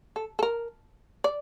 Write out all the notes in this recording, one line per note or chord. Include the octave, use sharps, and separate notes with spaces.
A4
A4
A#4
D5